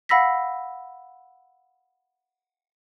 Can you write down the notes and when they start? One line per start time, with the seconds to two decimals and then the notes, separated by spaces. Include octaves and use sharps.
0.09 F5 F#5 B5 E6 A#6 B6